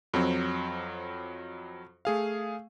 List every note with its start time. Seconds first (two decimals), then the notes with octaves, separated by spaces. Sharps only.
0.14 F2 F#3 C4
2.05 A3 G#4 F5